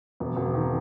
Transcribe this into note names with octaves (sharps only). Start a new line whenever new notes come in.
E1
E1
D#3